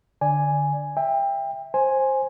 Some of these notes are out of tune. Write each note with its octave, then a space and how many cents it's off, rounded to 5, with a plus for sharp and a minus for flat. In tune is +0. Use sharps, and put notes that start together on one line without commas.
D3 +5 D5 +0 G#5 +0
E5 +0 G5 +25
C5 +15 G#5 +0